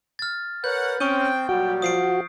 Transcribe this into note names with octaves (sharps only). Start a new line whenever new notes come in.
F6 A6
A#4 B4 C#5 F#5 G6
C4 C#4 G5 C#6 D#6 G6
A#2 F#3 G3 F#4 G5
F3 D#6 C7 D7